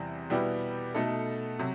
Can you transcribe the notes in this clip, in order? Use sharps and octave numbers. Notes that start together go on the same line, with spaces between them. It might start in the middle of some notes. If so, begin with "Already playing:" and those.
Already playing: E2 C3 E3 G3 C4
B2 G3 B3 E4 G4
B2 A3 D#4 A4
C3 F#3